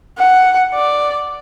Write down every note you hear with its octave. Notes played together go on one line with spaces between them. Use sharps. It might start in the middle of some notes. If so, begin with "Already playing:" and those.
F#5
D5